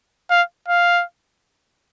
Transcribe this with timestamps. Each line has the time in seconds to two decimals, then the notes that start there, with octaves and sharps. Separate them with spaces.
0.30 F5
0.69 F5